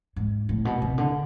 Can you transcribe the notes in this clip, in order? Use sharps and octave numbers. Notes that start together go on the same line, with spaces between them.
G#2
A2
B2
C3
D3